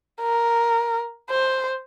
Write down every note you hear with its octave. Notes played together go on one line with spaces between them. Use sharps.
A#4
C5